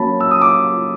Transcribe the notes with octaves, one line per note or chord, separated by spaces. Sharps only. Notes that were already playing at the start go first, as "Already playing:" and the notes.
Already playing: F#3 A#3 C#4 A5 B5
E6
D#6
D6